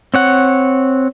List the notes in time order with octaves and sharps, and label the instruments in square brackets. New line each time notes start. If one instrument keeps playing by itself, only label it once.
[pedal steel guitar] C4 C#5 F#5